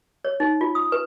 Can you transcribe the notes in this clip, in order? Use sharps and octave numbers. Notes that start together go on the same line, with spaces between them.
C#5
D#4
F4
D#6
B4